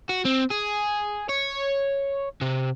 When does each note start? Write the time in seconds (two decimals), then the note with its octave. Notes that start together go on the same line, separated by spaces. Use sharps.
0.09 F#4
0.25 C4
0.51 G#4
1.29 C#5
2.41 C3